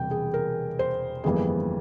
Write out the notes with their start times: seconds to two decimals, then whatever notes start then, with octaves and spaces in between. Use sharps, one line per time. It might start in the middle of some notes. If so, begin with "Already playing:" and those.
Already playing: E1 E2 C3 G3 G5
0.11 G#4
0.34 A#4
0.79 C5
1.24 G1 F2 E3 G3 A#3 G#4